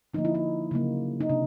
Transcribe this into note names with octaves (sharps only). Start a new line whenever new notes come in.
D3 F3 A#3 D#4
E4
D#4
C#3 F#3 A#3
D#4
C3 D4